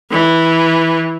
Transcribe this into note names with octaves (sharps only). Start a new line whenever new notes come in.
E3